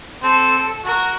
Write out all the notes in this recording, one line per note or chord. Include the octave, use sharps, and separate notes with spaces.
C4 A4
F#4 A#4